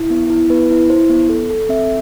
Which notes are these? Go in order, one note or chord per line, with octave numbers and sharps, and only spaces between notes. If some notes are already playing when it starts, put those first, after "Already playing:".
Already playing: E4
B3
E4
B3 B4
E4
E4 C5
B3
A4
A4
C4 E5